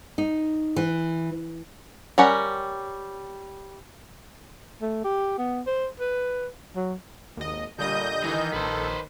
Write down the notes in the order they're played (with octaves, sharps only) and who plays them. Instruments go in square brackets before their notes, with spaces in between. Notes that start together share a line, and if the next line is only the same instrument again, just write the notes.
[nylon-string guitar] D#4
E3
[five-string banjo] G3 C#4 A#4 F#5
[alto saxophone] A3
G4
B3
C5
B4
F#3
[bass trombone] G#1 [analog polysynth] D#2 D#5
[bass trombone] A#2 [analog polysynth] D3 G3 D#6 [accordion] D#5 G6
[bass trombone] D#3 [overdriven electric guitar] E3
[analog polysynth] A#1 [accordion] A4 [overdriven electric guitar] B4 C5